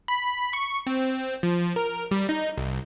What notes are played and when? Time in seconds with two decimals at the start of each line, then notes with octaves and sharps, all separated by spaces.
0.08 B5
0.53 C#6
0.87 C4
1.43 F3
1.76 A#4
2.11 G3
2.29 D#4
2.57 C2